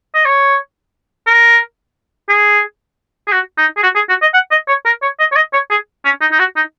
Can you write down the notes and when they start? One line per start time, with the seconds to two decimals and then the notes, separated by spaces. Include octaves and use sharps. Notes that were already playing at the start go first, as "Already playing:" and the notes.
0.14 D#5
0.25 C#5
1.27 A#4
2.29 G#4
3.27 G#4
3.32 F#4
3.58 D#4
3.77 G#4
3.83 F#4
3.95 G#4
4.09 F#4
4.22 D#5
4.34 F#5
4.51 D#5
4.68 C#5
4.85 A#4
5.02 C#5
5.19 D#5
5.32 C#5
5.36 D#5
5.53 C#5
5.71 G#4
6.05 C#4
6.21 D#4
6.32 D#4
6.39 F#4
6.56 D#4